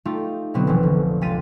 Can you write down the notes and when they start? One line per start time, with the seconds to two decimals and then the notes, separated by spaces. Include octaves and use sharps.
0.05 A3 D#4 F4 G4
0.54 B2 D3 F#3 B3 C4
0.67 F1 A#1 E3
0.83 D3
1.21 C#2 C3 F4 A6 B6 D#7